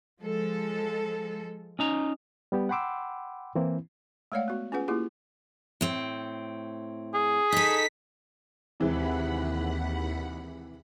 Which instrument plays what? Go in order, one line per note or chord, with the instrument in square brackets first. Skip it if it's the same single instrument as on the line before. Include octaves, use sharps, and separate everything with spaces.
[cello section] F3 G#3 A4
[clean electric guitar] C#4 D#4 A#5
[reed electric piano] G3 B3 G4
F#5 G5 B5 C6 D6 E6
E3 A#3 C4 E4
[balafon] G#3 A3 C#5 D5 F5 F#5
B3 F#4
C#4 F4 G#4 B4 F#5
A#3 E4 F4 G4 G#4
[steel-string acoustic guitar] A2 C4
[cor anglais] G#4
[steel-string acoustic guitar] D#4 A4 [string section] B6
[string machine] D#2 F#5 B5 [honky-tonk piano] C3 E3 G#3